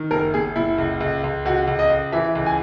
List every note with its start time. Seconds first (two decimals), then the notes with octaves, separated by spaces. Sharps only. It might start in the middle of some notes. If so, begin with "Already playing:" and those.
Already playing: D#3
0.11 F#1 A#4
0.34 F#1 G#4
0.56 F#1 E4
0.78 C#2
1.00 C#2
1.24 C#2
1.45 C#2 F#4
1.67 C#2
1.79 D#5
1.90 C#2
2.12 E3 E5
2.35 C#2
2.46 G#5